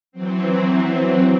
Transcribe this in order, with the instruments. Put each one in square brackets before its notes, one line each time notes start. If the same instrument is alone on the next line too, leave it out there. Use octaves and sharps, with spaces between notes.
[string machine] E3 F#3 C4